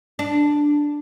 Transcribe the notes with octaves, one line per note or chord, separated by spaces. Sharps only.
D4